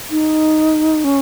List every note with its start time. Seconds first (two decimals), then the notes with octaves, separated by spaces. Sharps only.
0.11 D#4
1.04 C#4